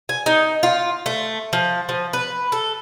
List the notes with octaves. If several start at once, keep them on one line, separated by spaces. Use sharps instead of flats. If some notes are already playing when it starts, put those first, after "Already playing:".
G#5
D#4
F4
A3
F3
F3
B4
A4